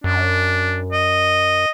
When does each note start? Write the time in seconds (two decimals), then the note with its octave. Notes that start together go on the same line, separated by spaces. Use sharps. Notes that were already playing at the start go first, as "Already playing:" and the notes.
0.04 F#2 D4
0.92 D#5